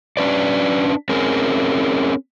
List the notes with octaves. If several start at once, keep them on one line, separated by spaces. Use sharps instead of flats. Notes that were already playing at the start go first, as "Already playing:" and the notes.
C#4 D4 B4 D5
C4 C#4 G#4 A#4